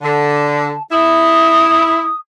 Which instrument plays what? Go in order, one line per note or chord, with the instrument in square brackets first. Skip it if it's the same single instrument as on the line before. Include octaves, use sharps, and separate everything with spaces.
[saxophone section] D3 [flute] A5
[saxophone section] E4 [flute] D#6